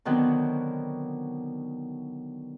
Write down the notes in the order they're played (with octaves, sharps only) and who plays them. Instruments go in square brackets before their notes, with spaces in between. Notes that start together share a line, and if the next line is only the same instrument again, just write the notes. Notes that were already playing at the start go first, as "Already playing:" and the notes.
[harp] B2 D3 D#3 F#3 B3 C4